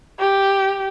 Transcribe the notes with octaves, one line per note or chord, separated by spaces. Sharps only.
G4